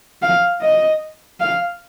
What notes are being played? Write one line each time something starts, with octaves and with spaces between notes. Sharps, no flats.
F5
D#5
F5